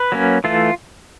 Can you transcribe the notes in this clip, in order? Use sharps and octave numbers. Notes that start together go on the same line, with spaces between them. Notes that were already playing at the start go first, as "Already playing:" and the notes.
Already playing: B4
F#3 A#3 C#4
E3 A3 F4